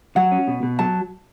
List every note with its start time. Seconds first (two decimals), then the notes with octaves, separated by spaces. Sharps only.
0.16 F#3 F#5
0.32 C#4
0.48 B2
0.63 B2
0.79 F#3 A5